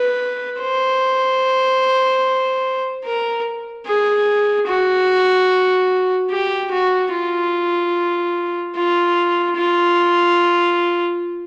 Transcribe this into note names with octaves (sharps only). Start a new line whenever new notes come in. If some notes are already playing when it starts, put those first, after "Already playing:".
Already playing: B4
C5
A#4
G#4
F#4
G4
F#4
F4
F4
F4